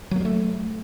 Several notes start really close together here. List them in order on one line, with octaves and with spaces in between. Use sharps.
F#3 A#3 G3 A3